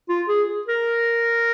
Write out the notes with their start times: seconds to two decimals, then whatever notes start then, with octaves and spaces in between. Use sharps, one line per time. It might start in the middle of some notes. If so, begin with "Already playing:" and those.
0.09 F4
0.29 G#4
0.48 G#4
0.67 A#4